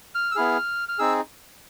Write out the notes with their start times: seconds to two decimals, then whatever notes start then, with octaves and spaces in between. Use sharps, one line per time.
0.15 F6
0.31 E6
0.35 B3 E4 G#4 F6
0.88 F6
0.98 C4 D#4 G#4 E6